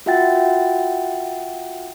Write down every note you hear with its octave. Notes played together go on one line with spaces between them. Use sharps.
F4 F#4 E5 F#5 G5 A6